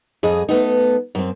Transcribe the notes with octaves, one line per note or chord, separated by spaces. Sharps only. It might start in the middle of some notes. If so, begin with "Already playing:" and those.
F2 G#4 D#5
A3 B3 D#4
F#2 C4